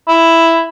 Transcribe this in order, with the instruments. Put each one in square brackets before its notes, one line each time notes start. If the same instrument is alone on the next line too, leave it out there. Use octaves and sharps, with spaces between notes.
[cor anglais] E4